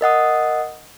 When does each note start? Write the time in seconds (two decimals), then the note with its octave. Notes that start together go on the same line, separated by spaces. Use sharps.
0.01 A#4 D#5 F#5 D#6